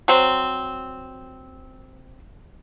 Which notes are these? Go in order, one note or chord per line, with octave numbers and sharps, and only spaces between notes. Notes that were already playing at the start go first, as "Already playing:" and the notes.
F#3 C4